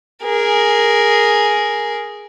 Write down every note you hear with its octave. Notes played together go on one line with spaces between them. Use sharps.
G#4 A#4